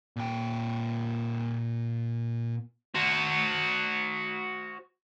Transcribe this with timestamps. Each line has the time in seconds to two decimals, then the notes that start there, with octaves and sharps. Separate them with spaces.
0.16 A#2 G5
2.95 F#4 C5